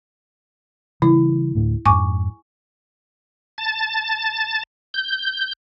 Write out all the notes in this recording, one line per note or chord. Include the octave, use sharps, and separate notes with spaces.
C#3 E3 G3 E4
D2 A2
F2 G#2 G#5 C#6 D6
A5 A6
G6